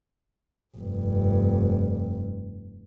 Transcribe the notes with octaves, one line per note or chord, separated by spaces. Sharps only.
F1 G2